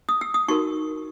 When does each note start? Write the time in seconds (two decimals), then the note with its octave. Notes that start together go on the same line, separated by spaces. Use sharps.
0.09 D#6
0.21 E6
0.34 D#6
0.48 D#4 F#4 A#4 C#6